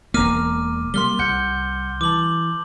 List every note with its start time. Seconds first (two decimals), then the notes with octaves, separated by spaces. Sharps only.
0.14 E1 A#3 D5 A#5 D6 F6 D#7
0.94 C3 G3 A#3 C6 F6 G7
1.19 C2 F#5 G6 C#7
2.01 E3 A5 D6 F#7